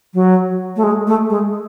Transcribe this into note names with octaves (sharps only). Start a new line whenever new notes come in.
F#3
A3
G#3
A3
G#3